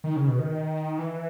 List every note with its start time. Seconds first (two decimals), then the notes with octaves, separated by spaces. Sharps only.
0.04 D#3
0.16 C#3
0.28 B2
0.39 D#3
0.99 E3